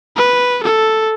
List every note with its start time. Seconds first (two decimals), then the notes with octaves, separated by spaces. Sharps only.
0.17 B4
0.63 A4